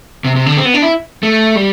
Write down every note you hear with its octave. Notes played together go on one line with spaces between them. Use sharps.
C3
C3
D3
C4
B3
D4
E4
A3
G3